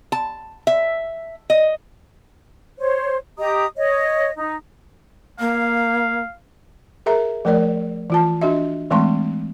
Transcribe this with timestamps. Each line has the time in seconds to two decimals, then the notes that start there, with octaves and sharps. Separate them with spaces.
0.12 A5
0.67 E5
1.50 D#5
2.79 C5 C#5
3.39 G4 D#5 A#5 D#6
3.77 C#5 D#5
4.37 D#4
5.40 A#3 F5
7.06 G#4 A#4 E5 A#5
7.45 F3 A3 A#4 C#5 D5
8.10 E3 F4 A5
8.41 D4 F#4 D#5 E5
8.90 E3 G#3 A3 C4 C6 C#6